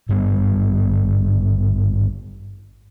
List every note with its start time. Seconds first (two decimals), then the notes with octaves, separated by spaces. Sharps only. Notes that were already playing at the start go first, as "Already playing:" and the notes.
0.09 G#1 G2 G3 B3